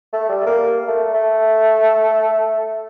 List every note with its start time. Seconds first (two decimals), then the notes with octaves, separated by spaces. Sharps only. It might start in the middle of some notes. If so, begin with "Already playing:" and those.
0.13 A3
0.29 G3
0.46 A#3
0.88 A3
1.14 A3